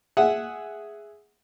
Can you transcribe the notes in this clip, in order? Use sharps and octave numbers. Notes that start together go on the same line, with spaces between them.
G#4 E5 F#5